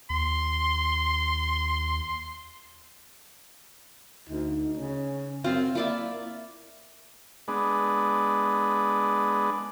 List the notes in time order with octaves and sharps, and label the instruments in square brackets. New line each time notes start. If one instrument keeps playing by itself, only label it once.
[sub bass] D#2 [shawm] C6
[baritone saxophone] D2 [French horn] D#4
[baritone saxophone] C#3 [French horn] C#4
[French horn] F#2 [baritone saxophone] C4 [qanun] F4 C5
[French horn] A#3 [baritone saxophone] E4 [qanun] F4 D5 E5
[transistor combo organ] G#3 B3 D4